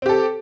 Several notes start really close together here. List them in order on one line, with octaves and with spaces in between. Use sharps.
C4 G4 A4